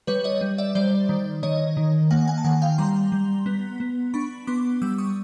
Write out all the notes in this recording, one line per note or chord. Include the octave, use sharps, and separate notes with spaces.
G3 B4 C#5
C#5 D#5
G3
D5 E5
G3 C5 D5
D#3
D#3 C#5 D#5
D#3
A#3 F#5 G#5
F#5 G#5
A5
D#3 F#5 G#5
F5 G5
G3 A#5 C6
G3
B3
B3
D4 B5 C#6
B3 C6 D6
G3 D6 E6
C#6 D#6